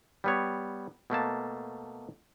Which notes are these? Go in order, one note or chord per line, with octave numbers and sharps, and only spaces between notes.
G3 B3 C#5
B2 A3 A#3 A5